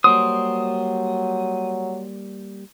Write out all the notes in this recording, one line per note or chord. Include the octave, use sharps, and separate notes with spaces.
F#3 G3 A#3 C5 D#6